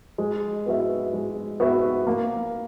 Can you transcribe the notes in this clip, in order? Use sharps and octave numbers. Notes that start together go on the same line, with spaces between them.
G#3
B3 F#4 B4 E5
G#3
B3 F#4 B4 E5
A#3